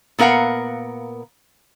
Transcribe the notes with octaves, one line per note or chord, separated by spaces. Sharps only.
A#2 B3 A#4 F5 F#5